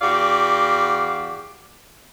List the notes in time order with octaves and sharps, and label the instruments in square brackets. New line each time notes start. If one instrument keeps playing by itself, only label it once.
[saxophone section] E2 F#4 G4 D5 F5